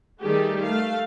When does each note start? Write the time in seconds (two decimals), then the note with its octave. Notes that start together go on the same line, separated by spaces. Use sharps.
0.21 D#3 G3 A3 G4 G#4
0.62 A3 F5